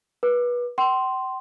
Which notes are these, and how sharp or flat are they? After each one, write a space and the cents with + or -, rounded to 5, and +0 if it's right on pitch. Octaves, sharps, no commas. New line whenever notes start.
B4 -25 D6 +20
G5 -45 C6 +0